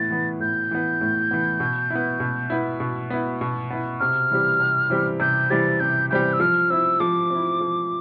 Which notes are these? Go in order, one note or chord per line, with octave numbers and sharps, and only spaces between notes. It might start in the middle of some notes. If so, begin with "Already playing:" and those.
Already playing: A2 E3 B3 A6
E3 B3
A2 G6
E3 B3
A2
E3 B3
B2
B3 E4
B2
B3 E4
B2
B3 E4
B2
B3 E4
C3 F6
E3 G3 C4 G4
C3
E3 G3 C4 G4
C3 G6
E3 G3 C4 G4 A6
C3 G6
E3 G3 C4 G4 G6
E6
F3 F6
C4 E4 E6
F3 D6
C4 E4
F3